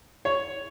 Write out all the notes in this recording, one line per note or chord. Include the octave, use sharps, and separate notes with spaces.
C#5